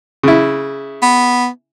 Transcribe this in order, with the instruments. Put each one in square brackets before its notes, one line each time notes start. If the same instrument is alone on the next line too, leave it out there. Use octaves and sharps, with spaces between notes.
[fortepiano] C#3 E4
[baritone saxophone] B3